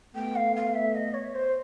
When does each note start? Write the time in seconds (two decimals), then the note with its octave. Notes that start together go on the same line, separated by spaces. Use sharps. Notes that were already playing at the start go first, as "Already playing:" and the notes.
0.15 A3 B3 G5
0.36 F5
0.56 F5
0.74 E5
0.95 D#5
1.14 C#5
1.35 C5